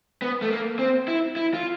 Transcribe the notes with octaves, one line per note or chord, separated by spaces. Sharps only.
B3
A3
A#3
C4
E4
E4
F4